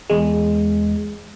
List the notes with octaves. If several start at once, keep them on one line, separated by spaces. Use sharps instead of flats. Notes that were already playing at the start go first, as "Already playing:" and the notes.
E2 G#3